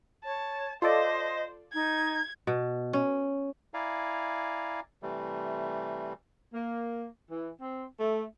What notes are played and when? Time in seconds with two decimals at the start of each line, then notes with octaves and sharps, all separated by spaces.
0.25 C#5 A5
0.82 F4 A4 C5 D5 D#5
1.73 D#4 G#6
2.47 B2
2.93 C#4
3.74 E4 D5 F5 G#5 A#5
5.03 C3 E3 G3 A3
6.54 A#3
7.29 E3
7.61 C4
8.00 A3